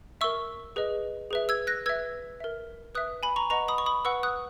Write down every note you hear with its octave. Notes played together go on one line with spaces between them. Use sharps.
A#4 E5 C#6 E6
G#4 B4 D#5
G#4 B4 E5
E6 G#6
F#6 A#6
B4 E5 E6 G#6
A#4 E5
B4 E5 D#6 F#6
G#5 B5
A#5 C#6
B4 D#5 F#5 A#5 C#6
B5 D#6
C#6
B5 D#6
B4 F#5 C#6 E6
D#6 F#6